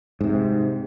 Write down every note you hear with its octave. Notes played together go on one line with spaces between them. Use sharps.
G#2 C3